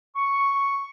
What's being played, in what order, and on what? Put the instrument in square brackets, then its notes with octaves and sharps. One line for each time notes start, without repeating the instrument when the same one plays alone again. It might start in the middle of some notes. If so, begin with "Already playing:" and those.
[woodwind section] C#6